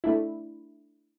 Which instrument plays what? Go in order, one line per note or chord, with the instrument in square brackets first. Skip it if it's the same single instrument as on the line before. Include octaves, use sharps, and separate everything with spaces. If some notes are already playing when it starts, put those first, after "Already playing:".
[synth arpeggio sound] A3 D4 E4